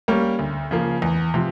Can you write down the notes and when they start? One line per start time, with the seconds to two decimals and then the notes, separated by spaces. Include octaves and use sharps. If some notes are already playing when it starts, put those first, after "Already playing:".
0.08 G3 A#3 C#4
0.39 D2
0.71 C#3 F3 A#3
1.02 E2
1.34 C3 F3